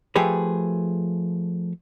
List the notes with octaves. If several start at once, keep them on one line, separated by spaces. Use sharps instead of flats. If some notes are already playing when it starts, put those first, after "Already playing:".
F3 A3 G4 G#4 B4